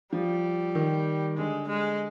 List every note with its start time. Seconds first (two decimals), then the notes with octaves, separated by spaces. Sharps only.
0.13 F3 G3
0.75 D#3
1.37 D3 G#3
1.68 G#3